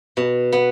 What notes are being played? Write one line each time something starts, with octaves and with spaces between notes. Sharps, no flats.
B2
B3